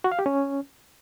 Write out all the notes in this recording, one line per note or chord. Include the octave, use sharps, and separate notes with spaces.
F#4
F5
G4
C#4